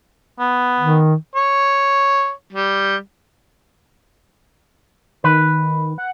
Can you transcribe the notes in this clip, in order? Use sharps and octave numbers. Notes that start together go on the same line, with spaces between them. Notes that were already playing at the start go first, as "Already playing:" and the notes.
B3
D#3
C#5
G3
D#3 B4
F#5